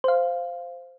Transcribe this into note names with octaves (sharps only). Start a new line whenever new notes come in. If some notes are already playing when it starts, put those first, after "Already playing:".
C5 F5